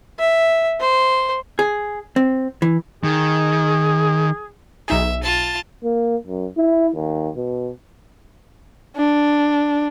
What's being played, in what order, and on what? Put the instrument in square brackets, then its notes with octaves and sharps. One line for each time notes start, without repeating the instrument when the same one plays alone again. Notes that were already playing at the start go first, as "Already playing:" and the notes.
[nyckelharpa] E5
C5
[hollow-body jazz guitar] G#4
C4
E3
[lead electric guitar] D#3 [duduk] G#4
[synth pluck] B1 D#4 G#4 [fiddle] E5
[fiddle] F4 A5
[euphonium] A#3
F#2
E4
D#2
B2
[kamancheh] D4